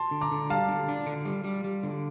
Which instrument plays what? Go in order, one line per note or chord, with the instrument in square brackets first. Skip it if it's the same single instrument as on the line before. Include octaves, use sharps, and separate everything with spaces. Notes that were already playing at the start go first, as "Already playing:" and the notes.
Already playing: [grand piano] A5 C6
[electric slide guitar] D3
[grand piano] A#5 D6
[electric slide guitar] D3
[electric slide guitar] G3 [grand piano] F5 A5
[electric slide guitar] D3
D4
D3
G3
G3
G3
D3